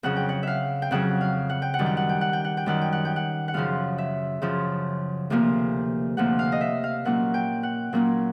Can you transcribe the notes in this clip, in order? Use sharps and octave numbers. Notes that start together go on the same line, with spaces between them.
F2 C#3 F#3 F#5
G5
F#5
E5 F5
G5
F2 C#3 F#3 F#5
F5
F#5
G5
F#5
F#2 D#3 G3
G5
F#5
G5
F#5
G5
F#5
G5
F#2 D#3 G3 F#5
G5
F#5
G5
F#5
F#5
F#2 C#3 F3 F5
E5
F#2 C#3 F3
D2 C3 F3 A#3
D2 C3 F3 A#3 F#5
F5
D#5
E5
F5
A#2 F#3 A#3 C#4 F#5
G5
F#5
A#2 F#3 A#3 C#4